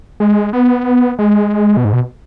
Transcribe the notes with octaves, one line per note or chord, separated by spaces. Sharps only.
G#3
B3
G#3
B2
G#2
B2